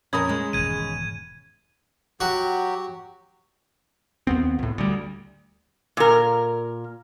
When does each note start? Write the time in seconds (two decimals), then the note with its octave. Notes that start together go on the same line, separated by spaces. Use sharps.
0.13 F2 C#4 A#4 B5 D#6 G#6
0.29 G#3
0.53 E1 G#2 D#3 G#6 D#7
2.20 F#3 F#4 G4
4.27 D#2 B3 C4
4.59 C#2 A2
4.78 D2 G3
5.97 A#2 A#4